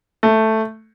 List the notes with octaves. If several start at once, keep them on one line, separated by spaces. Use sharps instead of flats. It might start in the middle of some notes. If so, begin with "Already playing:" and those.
A3